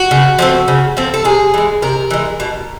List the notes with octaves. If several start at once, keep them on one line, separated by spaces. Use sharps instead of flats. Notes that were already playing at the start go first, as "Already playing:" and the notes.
Already playing: F#4
C#3
F3 A3 C4
C#3
F3 A3 C4
A4
C3 G#4
E3 G#3
C3 A#4
E3 G#3
B2